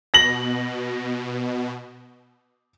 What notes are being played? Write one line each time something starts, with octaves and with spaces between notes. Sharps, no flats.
B2 A#6 F#7